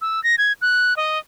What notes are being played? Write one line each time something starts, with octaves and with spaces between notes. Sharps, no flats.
E6
A#6
G#6
F#6
D#5